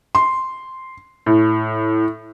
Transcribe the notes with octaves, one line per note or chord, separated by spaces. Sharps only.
C6
A2